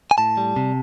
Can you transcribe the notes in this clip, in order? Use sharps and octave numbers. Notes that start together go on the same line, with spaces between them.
G#5
A2 A5
G3
C3